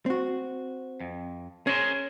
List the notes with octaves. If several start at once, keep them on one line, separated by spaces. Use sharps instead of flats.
C4 F#4
F2
C#4 G#4 A#4 C5